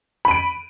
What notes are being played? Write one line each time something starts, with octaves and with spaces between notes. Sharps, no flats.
B5 D7 D#7